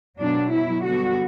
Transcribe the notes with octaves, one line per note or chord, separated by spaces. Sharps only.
B2 F#3 B3 D4
E4
D3 G3 B3 F#4